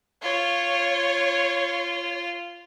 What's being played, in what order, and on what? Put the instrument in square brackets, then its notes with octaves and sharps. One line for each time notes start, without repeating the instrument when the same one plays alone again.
[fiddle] F4 [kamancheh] C#5